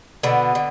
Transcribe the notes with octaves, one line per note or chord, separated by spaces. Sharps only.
B2 D3 B3
D3